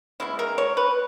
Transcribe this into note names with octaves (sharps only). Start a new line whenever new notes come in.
C#3 G#3 B3 E4
A#4
C#5
B4